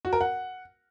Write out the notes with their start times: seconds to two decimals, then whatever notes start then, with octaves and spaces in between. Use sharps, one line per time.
0.05 F#4
0.13 A#4
0.21 F#5